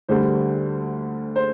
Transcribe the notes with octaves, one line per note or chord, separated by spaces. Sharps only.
D2 D3 G3 C5
C5